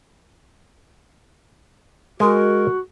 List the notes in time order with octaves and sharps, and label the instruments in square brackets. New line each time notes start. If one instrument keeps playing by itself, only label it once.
[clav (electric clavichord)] G#3 [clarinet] F#4 [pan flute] A#4